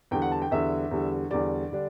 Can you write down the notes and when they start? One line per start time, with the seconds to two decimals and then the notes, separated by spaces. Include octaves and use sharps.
0.11 E2 D3 G3 G5
0.22 F#5
0.32 A5
0.42 G5
0.51 E2 D3 G3 E5
0.91 E2 D3 G3
1.31 E2 D3 G3 D5
1.72 D3 G3 D4